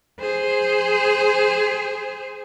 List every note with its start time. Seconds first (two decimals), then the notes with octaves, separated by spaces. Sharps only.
0.20 G#4 C5